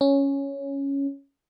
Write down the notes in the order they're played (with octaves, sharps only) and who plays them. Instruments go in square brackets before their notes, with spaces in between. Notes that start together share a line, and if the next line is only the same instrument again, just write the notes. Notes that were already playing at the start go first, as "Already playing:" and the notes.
[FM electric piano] C#4